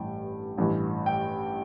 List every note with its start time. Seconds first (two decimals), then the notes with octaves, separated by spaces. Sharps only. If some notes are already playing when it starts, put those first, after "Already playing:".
Already playing: A1 G2 E3 G5
0.58 A1 G2 E3
1.06 G5